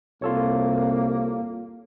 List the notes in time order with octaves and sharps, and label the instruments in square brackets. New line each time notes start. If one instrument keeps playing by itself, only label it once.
[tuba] C2 [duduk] A#3 [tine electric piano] F4 A4 C#5